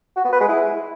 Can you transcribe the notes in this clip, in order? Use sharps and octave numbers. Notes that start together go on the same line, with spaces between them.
F#4
B3
B4
G#3
E4